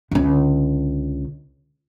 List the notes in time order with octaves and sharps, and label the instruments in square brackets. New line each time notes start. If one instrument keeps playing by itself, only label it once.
[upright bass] C#2 D3